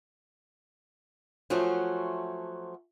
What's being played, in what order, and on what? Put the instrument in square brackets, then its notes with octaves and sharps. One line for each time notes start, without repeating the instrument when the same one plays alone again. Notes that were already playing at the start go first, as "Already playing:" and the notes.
[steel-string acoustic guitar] F3 F#3 A3 C#4 F#4 C5